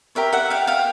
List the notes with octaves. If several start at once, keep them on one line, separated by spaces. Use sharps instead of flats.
G4 A#4 C#5 E5
E5 F#5
F5 G5
F5 G5